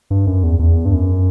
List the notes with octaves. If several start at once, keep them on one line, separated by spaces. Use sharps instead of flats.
G2
F#2
E2
E2
G2
F#2